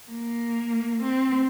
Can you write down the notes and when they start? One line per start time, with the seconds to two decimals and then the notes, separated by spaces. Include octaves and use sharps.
0.10 A#3
1.02 C4